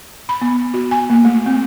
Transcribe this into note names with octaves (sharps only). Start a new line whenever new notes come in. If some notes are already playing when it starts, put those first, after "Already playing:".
B5
B3
F#4
G#5
A#3
A3
C4